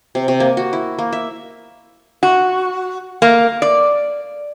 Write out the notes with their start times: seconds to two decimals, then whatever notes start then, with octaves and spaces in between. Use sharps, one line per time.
0.15 C3
0.28 C3
0.40 A#3
0.57 F#4
0.73 E4
0.99 A#3
1.13 E5
2.23 F#4
3.22 A#3
3.62 D5